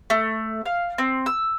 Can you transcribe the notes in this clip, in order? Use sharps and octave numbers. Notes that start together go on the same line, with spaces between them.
A3
F5
C4
E6